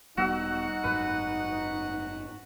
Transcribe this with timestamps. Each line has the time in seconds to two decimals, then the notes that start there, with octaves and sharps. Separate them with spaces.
0.17 E1 G3 B3 D#4 F#4 F#5 E6
0.84 F#1 G#2 F#3 B4